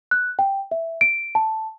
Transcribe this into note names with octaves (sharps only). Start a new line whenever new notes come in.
F#6
G5
E5
D7
A5